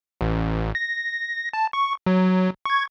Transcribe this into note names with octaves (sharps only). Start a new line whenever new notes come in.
A1
A#6
A5
C#6
F#3
C#6 G#6